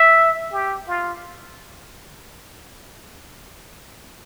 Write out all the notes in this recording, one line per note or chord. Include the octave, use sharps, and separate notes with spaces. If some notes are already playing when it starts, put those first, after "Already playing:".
Already playing: E5
G4
F4